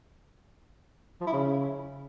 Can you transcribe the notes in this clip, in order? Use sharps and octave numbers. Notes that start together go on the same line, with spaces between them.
F3
E4
C#3